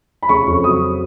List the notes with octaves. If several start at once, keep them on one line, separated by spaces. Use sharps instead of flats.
B5
C#3 C#6
F2
C#6
F#3 D#6